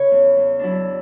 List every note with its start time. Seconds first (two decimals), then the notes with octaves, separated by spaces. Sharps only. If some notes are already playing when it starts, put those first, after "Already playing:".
Already playing: C#3 B4 C#5
0.11 E2
0.37 E2
0.59 F#3 D4 E4